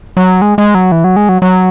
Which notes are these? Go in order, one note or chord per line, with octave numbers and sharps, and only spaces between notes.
F#3
G#3
G#3
F#3
E3
F#3
G#3
F#3
F#3